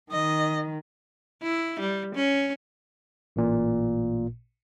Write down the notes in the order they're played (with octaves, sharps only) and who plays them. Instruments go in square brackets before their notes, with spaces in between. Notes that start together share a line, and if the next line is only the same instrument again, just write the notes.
[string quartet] D#3 [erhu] D#5
[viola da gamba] E4
G3
C#4
[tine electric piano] A1 A#2